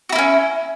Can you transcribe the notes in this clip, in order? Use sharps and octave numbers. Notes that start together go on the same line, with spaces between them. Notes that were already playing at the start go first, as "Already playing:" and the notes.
A#3 C#4 E4 F#4